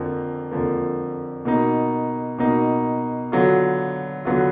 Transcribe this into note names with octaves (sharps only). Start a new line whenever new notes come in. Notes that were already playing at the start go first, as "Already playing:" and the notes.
Already playing: F2 D3 F3 A#3
F2 D3 F3 A#3
B2 A#3 D#4
B2 A#3 D#4
D3 F#3 B3 F4
D3 F#3 B3 F4